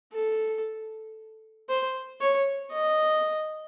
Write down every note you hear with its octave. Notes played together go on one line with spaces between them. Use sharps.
A4
C5
C#5
D#5